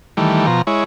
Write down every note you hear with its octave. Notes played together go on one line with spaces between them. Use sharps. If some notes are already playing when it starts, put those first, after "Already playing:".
D#3 E3 G3 A3
B2 F3 A#5
G#3 E4 C#5